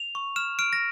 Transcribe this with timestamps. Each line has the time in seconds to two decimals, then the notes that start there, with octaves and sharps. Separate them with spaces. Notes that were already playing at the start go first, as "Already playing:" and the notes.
Already playing: F7
0.15 C#6
0.36 F6 E7
0.59 F6 D7
0.73 A#6